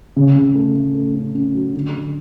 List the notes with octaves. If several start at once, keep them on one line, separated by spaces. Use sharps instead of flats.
C#3
C#3
A3
A3
A3
C#4
C#4
F#3
D3
D3